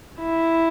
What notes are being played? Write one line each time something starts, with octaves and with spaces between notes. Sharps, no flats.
E4